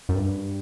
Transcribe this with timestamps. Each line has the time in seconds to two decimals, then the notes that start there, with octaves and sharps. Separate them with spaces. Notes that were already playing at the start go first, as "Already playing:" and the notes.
0.09 F#2
0.15 G2